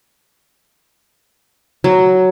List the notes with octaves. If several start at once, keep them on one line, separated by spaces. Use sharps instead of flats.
F#3